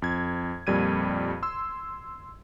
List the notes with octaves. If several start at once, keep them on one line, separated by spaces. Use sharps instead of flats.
F2 G#6
F2 A#2 G3 G#6 D#7
C6 E6